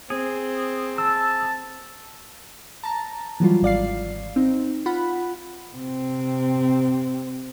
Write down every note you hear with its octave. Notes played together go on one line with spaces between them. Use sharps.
C4 G#4
A5 E6
A5 A#5
E3 F#3 G3 F4
G#1 D5 F5 C7
C4 D#4
F4 F#5 B5
C3 C4